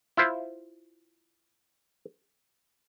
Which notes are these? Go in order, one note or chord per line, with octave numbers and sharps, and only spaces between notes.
E4 F4 C5